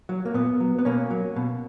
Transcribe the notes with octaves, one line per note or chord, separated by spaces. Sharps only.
F#3
A#3
A#2 B3
F#3
B3
B2 A#3 C#4
F#3
B2